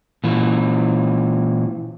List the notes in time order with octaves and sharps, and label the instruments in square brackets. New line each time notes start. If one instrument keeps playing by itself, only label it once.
[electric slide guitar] A#2 E3